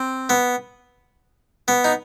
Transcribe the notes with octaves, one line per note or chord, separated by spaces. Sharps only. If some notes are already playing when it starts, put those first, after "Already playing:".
Already playing: C4
B3
B3
D#4